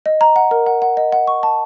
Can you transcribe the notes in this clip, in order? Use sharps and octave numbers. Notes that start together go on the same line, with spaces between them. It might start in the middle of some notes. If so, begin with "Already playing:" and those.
D#5
A#5
F#5
A#4
F#5
F#5
D#5
F#5
C#6
A5